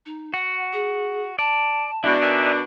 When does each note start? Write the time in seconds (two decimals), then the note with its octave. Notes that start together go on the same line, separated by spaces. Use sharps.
0.06 D#4
0.34 F#4 F#5
0.73 G#4
1.39 D5 A5
2.04 B2 G#3 D4 E4
2.22 D#4 A#4 E5 G#5